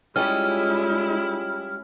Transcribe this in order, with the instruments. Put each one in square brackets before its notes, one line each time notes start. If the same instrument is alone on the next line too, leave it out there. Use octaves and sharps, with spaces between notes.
[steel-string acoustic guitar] G3 F4 D#5 [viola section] G#3 E4 [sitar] C#4 [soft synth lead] F6